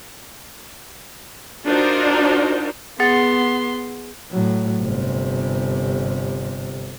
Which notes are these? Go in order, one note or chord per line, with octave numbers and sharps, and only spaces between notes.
D4 D#4 F4 F#4 A#4 C5
B3 G#4 F#5 C6 A6
A2 F#3
G1 C3